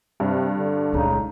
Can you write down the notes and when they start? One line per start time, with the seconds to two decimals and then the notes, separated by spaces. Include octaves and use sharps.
0.20 G2 C3
0.57 D3
0.93 C#2 A#2 C#3 G#3 D#4